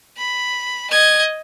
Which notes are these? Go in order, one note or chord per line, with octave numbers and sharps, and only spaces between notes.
B5
D#5 G#6